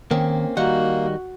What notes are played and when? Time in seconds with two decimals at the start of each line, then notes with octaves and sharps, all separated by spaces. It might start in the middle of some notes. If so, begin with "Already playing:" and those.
0.11 D#3 A#3 C4 C#4
0.57 D#3 G3 A#3 D#4 F#4 F#5